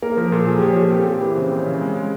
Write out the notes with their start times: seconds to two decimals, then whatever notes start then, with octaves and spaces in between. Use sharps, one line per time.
0.02 A#3 A#4
0.17 F3 A#4
0.32 A#2 A4
0.47 F3 G#4
0.59 G4
0.62 F3
0.70 C#5
0.77 A#2 A4
0.91 C4 G4
1.06 C4 G4
1.21 E3 B4
1.36 C#3 C5
1.51 C4
1.59 C#5
1.67 C#3
1.81 G#3
1.96 G#3